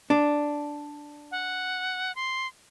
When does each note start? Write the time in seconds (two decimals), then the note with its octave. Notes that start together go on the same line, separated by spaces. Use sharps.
0.10 D4
1.31 F#5
2.16 C6